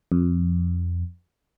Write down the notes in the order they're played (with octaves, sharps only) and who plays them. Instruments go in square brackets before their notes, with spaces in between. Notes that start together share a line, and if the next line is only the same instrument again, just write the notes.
[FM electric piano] F2